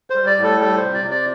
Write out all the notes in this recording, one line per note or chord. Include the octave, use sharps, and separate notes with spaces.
C5
G3
D5
A2
A4
G3 A4
C5
C3
D5
C3
D5